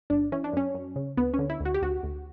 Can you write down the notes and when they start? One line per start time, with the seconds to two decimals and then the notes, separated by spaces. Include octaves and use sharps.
0.10 G1 D4
0.32 E3 C#4
0.44 D4
0.53 F#2 C#4
0.75 F#2
0.96 C#3
1.17 D2 B3
1.34 C#4
1.39 D3
1.50 E4
1.60 D2
1.65 F#4
1.74 G4
1.82 D2 F#4
2.03 D2